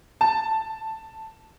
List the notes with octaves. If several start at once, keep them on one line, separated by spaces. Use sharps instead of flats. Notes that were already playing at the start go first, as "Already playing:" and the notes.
A5